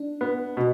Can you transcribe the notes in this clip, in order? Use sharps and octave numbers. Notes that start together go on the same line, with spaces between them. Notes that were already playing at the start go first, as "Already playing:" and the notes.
Already playing: D4
B3
B2